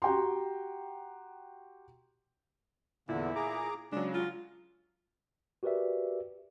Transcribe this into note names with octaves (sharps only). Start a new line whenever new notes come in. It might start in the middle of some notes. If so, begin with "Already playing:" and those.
F#4 G4 G5 A#5 C6
E2 A#2 D3 E4
G#4 A#5 D6
C#3 F#3 G#3 D4
F4
F#4 G4 A#4 B4 D5 E5